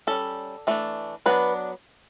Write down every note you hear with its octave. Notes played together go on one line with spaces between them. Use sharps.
G3 C#4 A4
E3 A3 D4
F#3 B3 D4 B4